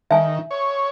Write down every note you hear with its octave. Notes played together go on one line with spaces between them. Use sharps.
D#3 E5 G#5
C#5